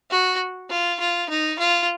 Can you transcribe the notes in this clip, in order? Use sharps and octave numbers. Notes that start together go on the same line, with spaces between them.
F#4
F4
F4
D#4
F4